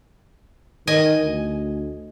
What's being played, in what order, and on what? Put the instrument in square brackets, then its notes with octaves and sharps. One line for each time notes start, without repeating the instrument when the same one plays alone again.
[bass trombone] D#3 [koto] D#5 G#5
[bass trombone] D2